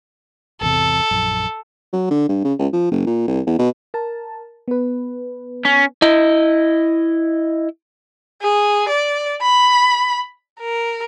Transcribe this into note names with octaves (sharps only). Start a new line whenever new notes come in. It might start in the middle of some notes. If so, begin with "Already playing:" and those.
G#1 E2 C3 A4
A#1 F#2
F#3
D3
G2
C#3
C#2
F3
F#1
A#2
C2
E2
B2
A#4 A5
B3 B4
C#4
E4 D#5
G#4
D5
B5
A#4